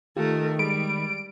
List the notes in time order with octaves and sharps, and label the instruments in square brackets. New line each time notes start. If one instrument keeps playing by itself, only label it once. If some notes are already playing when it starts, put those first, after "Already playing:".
[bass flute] D#3 [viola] A3 A#4 [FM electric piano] F4 G4
[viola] G3 [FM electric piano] G#3 B5 [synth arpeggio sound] D7